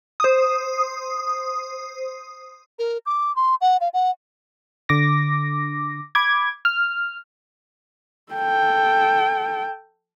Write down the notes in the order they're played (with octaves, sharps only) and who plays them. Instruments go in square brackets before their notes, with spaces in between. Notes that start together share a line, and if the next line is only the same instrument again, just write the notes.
[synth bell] C5 D#6
[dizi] A#4
D6
C6
F#5
F5
F#5
[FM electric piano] D3 D6 A#6
B5 D6 G#6
F6
[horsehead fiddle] A4 G5